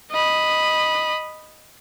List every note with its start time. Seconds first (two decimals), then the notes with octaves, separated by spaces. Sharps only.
0.11 D#5 B5